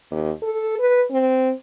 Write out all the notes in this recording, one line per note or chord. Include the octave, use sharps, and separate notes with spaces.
D#2
A4
B4
C4